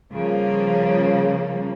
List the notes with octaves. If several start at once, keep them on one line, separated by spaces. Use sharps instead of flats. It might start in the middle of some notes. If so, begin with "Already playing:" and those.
C#3 F3 G3 A#3